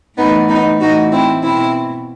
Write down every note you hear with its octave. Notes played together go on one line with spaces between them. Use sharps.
A2 E3 B3 D#4
B3 D#4
A2 E3 D#4 F#4
C4 E4
B2 C4 E4